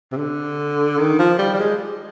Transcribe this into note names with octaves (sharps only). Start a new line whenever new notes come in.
C3
D3
D#3
F3
G3
G3
G#3